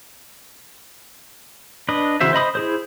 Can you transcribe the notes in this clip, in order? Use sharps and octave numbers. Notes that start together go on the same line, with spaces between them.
D4 B4 D#5
C#3 E3 F#4 C5 E5
C5 D#5 B5 D#6
E4 G#4 C5